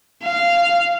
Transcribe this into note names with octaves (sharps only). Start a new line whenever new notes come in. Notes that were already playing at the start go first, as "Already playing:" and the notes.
F5